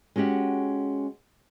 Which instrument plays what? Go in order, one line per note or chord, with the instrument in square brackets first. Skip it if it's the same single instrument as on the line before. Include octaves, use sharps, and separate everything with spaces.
[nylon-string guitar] G#3 C#4 F#4 G4 F#5